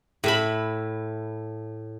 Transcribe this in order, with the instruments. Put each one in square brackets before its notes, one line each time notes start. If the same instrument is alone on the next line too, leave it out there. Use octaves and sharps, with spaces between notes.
[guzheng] A2 E5 B5